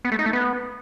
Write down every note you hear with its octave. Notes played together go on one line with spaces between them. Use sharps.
B3
A3
D#4
A3
B3